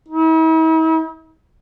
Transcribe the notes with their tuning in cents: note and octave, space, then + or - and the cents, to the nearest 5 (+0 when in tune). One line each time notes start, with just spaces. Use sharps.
E4 -45